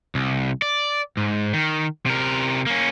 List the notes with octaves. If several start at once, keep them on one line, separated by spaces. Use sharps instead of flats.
C2
D5
G#2
D#3
C3 A#4
A#3 C#4